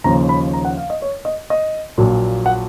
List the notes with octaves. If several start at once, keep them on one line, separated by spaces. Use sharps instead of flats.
D#2 C#3 F3 A#5
B5
A#5
F#5
F5
D#5
C#5
D#5
D#5
A#1 A#2 F#3
F#5